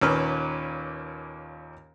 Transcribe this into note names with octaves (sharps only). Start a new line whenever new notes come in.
D#2 A#2 C#4 B4 F6